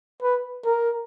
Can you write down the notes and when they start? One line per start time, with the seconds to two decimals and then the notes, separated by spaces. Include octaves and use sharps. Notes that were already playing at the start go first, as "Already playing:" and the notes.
0.22 B4
0.65 A#4